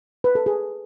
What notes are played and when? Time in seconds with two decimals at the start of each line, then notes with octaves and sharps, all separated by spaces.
0.24 B4
0.35 A4
0.46 G#4